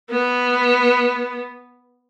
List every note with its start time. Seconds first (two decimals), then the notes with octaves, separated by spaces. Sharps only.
0.11 B3